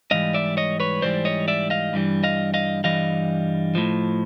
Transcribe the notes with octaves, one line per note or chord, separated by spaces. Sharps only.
G#2 E3 G3 D#5 F5
D5 E5
C#5 D#5
B4 C#5
G#2 E3 G3 C5 D5
C#5 D#5
D5 E5
D#5 F5
G2 E3 G3
D#5 F5
D#5 F5
G2 E3 G3 D#5 F5
A2 F3